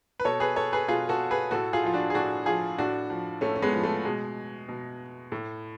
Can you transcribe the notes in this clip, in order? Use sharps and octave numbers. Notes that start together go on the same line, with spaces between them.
B4
B2 A4 C#5
G#4 B4
A4 C#5
G#4 B4
B2 F4 G#4
F#4 A4
G#4 B4
A2 F#4 A4
F4 G#4
F3 F4
D4 F#4
G#4
A2 D4 F#4
F3 F4 G#4
A2 D4 F#4
F3
A2 A3 C#4
C#4
G#3 B3
F3
A3
B2 G#3
B2
A2